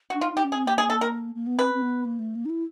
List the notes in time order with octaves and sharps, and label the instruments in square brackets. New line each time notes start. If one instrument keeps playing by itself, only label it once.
[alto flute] D4 [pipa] F#4
[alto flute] D#4 [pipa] F4
[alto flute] D#4 [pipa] G4
[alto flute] C#4
[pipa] G#4
[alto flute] C4
[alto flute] A#3 [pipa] G4
[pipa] G#4
A4
A#4
[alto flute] A#3
B3
[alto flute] C4 [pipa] B4
[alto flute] C4
B3
A#3
A3
A#3
D#4
E4